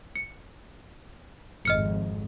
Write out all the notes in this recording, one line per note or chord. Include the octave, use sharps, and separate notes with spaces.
C#7
G#1 F2 D#5 F6 C#7